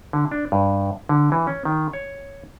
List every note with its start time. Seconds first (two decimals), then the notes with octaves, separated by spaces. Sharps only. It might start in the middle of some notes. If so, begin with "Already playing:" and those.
0.13 D3
0.31 D4
0.52 G2
1.09 D3
1.32 E3
1.47 C#4
1.65 D#3
1.93 C#5